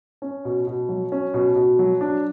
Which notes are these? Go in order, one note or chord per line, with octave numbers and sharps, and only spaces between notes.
C#4
B2
B2
F#3
C#4
B2
B2
F#3
D4